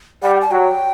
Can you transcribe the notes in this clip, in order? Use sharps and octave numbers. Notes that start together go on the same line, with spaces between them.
G3 F#5
G5
A5
F#3 G5